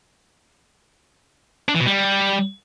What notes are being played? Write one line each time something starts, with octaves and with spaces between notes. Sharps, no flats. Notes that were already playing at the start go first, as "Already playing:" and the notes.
D4
E3
B2
G3